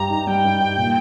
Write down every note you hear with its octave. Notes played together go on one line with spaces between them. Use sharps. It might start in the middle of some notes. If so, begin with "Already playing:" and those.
Already playing: G2 G4 A#5
D#4
G3 G5
G2
G4
A#2